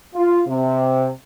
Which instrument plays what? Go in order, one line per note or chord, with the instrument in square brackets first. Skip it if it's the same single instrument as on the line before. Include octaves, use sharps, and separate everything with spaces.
[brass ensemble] F4
C3